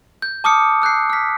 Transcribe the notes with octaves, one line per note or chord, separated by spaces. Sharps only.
G6
A5 D6 D#6 F6 C#7
E6 F#6 G6 C7
F6 B6